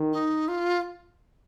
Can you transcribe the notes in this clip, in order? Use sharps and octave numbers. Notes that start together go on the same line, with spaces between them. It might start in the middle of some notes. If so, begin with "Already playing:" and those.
Already playing: D#3
D#4
F4